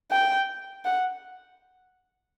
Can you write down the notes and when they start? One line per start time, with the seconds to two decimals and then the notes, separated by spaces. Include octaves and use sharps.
0.12 G5
0.85 F#5